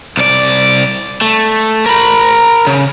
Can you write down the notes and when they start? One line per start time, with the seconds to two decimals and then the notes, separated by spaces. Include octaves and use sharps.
0.17 C2 D5
1.21 A3
1.86 A#4 B5
2.67 C#3